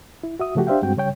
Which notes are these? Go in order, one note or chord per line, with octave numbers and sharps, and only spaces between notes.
E4
F#4 E5 D#6
C#3 F3 A3 F#4 G4
D4 G4 C5 E5 F5 G5
G2 G#3 C4 F#4 G5
C#3 G3 C#5 G5